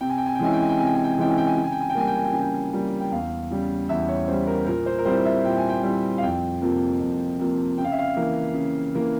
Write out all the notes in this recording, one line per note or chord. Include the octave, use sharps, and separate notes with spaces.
C3 G5
G#5
G5
G#5
G5
E3 G#3 C#4 E4 G#5
G5
G#5
G5
C3 G#5
G5
G#5
G5
G#5
E3 G#3 C#4 E4 G5
G#5
G5
G#5
C#3 G5
G#5
G5
G#5
G5
G3 A#3 G#5
G5
G#5
G5
C#3 G#5
G5
G3 A#3
G5
E2 F5
C#3 G3
E2 E5
C#5
C#3 G3 C5
A#4
A#2 A#4
C5
A#4
G3 C4 E4 C5
E5
A#2 G5
G#5
G5
G3 C4 E4
F5
F2 G5
C3 F3 A#3
F2
C3 F3 A#3
C#3 G5
F5
E5
F5
E3 A#3
C#3
E3 A#3